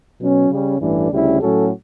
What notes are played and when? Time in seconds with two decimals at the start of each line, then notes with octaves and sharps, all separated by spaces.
0.19 B2 F#3 C#4
0.49 C#3 G3 C#4
0.79 A1 G2 E3 A3 D4
1.11 D2 C#3 G3 C#4 E4
1.40 A2 F#3 C#4 F#4 A4